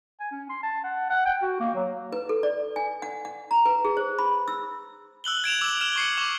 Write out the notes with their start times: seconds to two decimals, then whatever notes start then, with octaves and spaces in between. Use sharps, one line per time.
0.20 G#5
0.31 C#4
0.49 C6
0.63 A5
0.84 F#5
1.10 F#5
1.25 G5
1.42 F#4
1.60 A#3
1.75 F#3
2.12 B4
2.29 A4
2.43 D5
2.76 G#5
3.02 F#5
3.25 F#5
3.51 A#5
3.66 B4
3.85 G#4
3.97 C5
4.19 B5
4.48 E6
5.24 E6 F#6 F#7 G7
5.44 G#6 D7 E7 F7
5.61 D6 E6 F#7
5.81 F6 E7 G7
5.96 C#6 C7 C#7
6.17 C#6 D6 E7